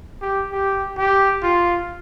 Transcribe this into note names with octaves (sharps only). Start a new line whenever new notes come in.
G4
G4
G4
F4